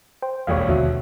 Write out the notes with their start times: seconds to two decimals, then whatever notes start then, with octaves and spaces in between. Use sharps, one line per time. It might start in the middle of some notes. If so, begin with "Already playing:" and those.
0.22 C5 G5
0.47 E1 A#1 D#2 C#5 F5
0.69 D#2 B2 D3 E5